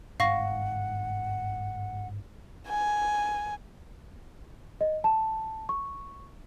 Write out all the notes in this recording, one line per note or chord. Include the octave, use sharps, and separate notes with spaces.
G1 G#2 F5 F#5 C#6 A#6
G#5
D#5
A5
C#6